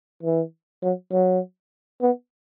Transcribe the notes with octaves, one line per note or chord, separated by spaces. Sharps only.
E3
F#3
F#3
B3